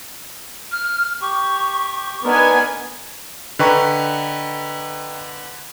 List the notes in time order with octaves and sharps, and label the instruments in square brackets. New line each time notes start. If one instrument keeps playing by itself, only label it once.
[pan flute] F6
[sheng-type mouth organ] G4 [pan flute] C#6
[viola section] B3 B4 G#5 [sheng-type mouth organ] D4 D#4 A#4
[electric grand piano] D3 B4 C#6 [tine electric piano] D#5 G5 A#5